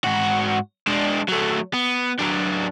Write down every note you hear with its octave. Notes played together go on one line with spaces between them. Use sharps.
G#2 F#4
G#3 D4
F#3 A3
B3
F#3 D4